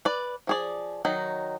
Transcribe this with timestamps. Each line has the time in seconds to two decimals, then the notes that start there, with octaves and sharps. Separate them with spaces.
0.05 B4 D5
0.47 F3 G#4 D5
1.05 D#3 F#3 D#4